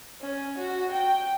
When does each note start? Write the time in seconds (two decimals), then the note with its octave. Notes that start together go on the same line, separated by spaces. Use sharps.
0.20 C#4
0.58 F#4
0.92 G5